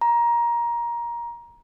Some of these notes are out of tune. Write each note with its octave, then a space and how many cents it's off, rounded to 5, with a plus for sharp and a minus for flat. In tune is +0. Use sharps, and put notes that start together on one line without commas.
A#5 +20